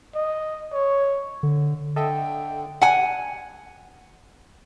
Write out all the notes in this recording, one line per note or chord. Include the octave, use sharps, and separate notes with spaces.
D#5
C#5
D3
D3 A4 D#5 E5 G5
F#5 G#5